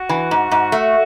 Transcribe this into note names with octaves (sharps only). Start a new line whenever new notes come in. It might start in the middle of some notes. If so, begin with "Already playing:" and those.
Already playing: F#4
E3
G#2
G#2
A3